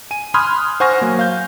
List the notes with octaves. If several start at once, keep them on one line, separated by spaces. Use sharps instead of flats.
G#5 D#7
B5 C6 D#6 F6 F#6 G#6
C5 F#5 G#5 C#6 F6 A#6
F#3 A#3
F5 G6